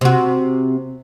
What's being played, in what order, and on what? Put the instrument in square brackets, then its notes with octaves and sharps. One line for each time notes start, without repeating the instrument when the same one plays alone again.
[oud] C3 F#4